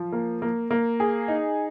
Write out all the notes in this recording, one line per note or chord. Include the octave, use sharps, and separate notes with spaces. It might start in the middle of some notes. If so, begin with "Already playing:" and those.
Already playing: F3
A#3
A#3
A#3
G#4
D#4